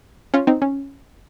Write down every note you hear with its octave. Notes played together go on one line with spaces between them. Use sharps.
C#4 F4
C4 D#4
C#4